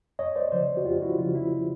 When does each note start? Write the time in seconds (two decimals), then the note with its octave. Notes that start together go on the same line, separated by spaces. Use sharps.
0.19 F2 C#5 D#5
0.36 C5 D5
0.52 C#3 F3 C5 D5
0.77 F#4
0.85 F2 F4 G4
1.02 E4 F#4
1.19 C#3 F3 F4
1.35 E4